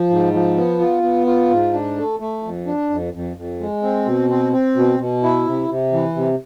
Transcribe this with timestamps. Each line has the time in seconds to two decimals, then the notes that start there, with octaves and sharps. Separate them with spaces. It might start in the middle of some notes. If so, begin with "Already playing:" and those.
Already playing: F3
0.10 G#2
0.33 F3
0.56 B3
0.80 F4
1.03 B3
1.26 F4
1.50 G#2
1.73 D4
1.97 A3
2.20 A3
2.43 F2
2.67 D4
2.90 F2
3.13 F2
3.37 F2
3.60 G#3
3.83 C4
4.06 B2
4.30 C4
4.53 C4
4.76 B2
4.99 B2
5.23 E4
5.46 C3
5.69 C3
5.92 E3
6.16 C3